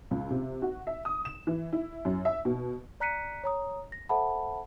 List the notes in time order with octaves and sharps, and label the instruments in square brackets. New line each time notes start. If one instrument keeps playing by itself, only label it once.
[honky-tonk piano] C#2
C3
F#4
E5
D#6
E7
E3
E4
F#2
E5
B2
[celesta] D5 A#5 F#6 B6 C#7 D#7
C#5 A#5 D#6
A#6
A4 C5 E5 F#5 A5 B5